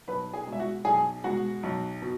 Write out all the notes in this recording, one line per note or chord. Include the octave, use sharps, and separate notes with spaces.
B1 B4 B5
G#4 G#5
B2 G#3
E5
F#4 F#5
B1 G#4 G#5
B2 G#3 F#4 F#5
B1
B2